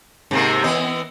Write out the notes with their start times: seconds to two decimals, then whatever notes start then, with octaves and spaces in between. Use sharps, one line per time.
0.31 G#2 C3 A#3
0.64 E3 B3 D#5